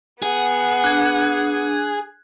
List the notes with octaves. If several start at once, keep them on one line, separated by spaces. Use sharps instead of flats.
B3 G#4 F#5
D4 F#6 G#6